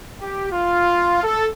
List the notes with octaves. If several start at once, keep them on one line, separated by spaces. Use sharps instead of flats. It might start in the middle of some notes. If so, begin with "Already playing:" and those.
G4
F4
A4